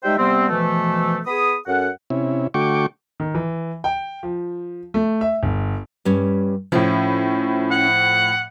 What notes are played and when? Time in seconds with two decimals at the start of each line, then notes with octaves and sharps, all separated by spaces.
0.03 G3 G#3 D#4 C5 E5 G5
0.17 C3 G3 B3 C4
0.49 B2 E3 F3 A3
1.26 B3 G#4 B5 D#6
1.66 F#2 C#4 A4 F#5
2.10 C3 C#4 E4
2.54 D3 A3 F#4 G5 C#6 D6
3.20 D#3
3.35 E3
3.84 G5
4.23 F3
4.94 A3
5.21 E5
5.43 G1
6.05 G2 G3 C#4
6.72 A2 F3 C#4 E4 F4 E5
7.71 F#5